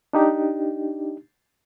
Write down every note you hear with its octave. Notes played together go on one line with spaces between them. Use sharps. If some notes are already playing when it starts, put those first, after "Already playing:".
D4 D#4 G4